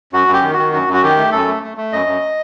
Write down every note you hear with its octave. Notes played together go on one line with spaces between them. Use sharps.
F#2 F#4
F#2
G4
D#3
D#3 F#4
F#2 F#4
F#2
F#4
D#3 G4
A3
F#2 A4
A3
A3
A3
F#2 D#5
F#2